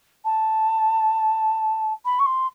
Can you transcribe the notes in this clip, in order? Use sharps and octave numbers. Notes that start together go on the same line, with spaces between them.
A5
B5
C#6
C6